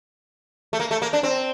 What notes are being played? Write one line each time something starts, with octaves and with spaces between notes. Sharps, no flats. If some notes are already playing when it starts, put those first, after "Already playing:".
A3
A#3
A3
A#3
D4
C4